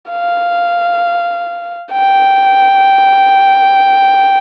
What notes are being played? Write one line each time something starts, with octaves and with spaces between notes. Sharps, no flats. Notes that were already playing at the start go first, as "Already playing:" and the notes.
F5
G5